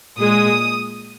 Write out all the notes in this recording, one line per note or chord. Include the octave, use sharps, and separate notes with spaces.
A#2 G#3 D#6